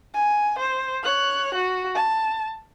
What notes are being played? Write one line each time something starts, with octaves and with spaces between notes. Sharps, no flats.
G#5
C5
C#5 F#6
F#4
A5